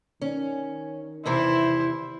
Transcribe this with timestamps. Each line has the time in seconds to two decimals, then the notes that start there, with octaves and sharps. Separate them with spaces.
0.22 D#3 C#4
1.26 E2 C3 E3 E4 C5